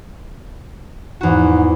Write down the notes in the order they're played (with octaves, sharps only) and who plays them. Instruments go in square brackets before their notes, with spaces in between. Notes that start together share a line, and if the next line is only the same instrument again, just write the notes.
[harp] E2 F#4 [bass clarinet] G#2